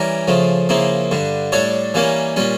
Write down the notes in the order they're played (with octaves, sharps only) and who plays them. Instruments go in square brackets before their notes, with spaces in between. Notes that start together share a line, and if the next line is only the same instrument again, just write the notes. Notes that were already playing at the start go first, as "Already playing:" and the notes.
Already playing: [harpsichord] E3 G3 C#4 G4 A#4
C#3 F3 A3
C#3 F3 A#3 E4
G2 D3 G3
A2 G3 D4 A4 C#5
E3 G3 A#3 C#4
A#2 G3 C#4